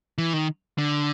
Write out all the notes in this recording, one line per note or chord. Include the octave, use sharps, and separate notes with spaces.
E3
D#3
D3